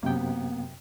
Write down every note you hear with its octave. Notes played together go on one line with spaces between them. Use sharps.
F#2 C3 A#3 B3 G5